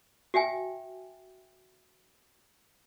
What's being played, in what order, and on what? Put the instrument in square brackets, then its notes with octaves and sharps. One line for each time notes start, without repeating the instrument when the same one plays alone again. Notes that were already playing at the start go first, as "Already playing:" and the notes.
[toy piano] F#4 E5 G5 G#5